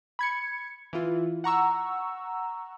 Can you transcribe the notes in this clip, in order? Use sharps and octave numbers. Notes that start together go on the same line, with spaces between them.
B5 G#6 C#7
E3 E4 F4
F#5 A#5 C#6 E6